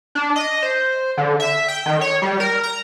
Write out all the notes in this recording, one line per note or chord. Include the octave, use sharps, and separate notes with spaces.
D4
D#5
C5
D3
E5
G5
D#3
C#5
G3
A#4
A#5